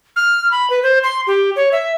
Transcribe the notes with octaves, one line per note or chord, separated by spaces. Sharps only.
F6
B5
B4
C5
C6
G4
C#5
E5